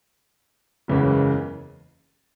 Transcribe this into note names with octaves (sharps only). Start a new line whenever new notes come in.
F#1 E2 C#3 E3 G#3